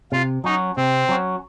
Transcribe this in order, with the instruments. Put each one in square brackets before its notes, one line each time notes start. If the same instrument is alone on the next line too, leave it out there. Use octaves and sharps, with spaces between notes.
[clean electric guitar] C3 [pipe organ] F4
[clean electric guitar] F#3 C#4 F#4 [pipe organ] D#4
[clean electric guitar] C3 [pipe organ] C4
[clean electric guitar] F#3 C#4 F#4